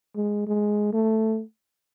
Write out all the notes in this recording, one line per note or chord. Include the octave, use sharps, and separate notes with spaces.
G#3
G#3
A3